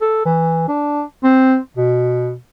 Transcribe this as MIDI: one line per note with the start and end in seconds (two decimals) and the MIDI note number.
0.01 0.25 69
0.25 0.65 52
0.68 1.03 62
1.24 1.58 60
1.77 2.35 47